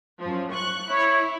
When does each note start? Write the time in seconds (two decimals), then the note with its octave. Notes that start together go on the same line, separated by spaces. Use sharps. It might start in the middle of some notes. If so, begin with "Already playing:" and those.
0.21 F#2 F3
0.53 C#6 F#6
0.90 E4 C#5